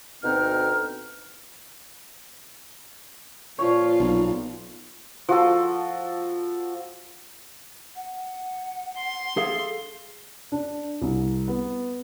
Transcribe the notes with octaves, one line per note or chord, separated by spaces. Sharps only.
D2 B2 C4 D#4 F6
A#2 F3 F4 C#5
B1
F3 F#4 A4
F#5
C6
G#4 A4 F5
D4
C2
B3